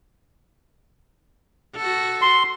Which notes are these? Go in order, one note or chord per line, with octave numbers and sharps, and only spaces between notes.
F#4 A4
C6